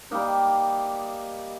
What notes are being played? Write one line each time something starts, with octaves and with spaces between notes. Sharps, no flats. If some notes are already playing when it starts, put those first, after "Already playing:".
G3 A#3 D#4